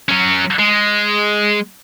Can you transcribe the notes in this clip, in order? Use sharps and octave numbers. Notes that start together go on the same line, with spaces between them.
F#3 C#4
G#3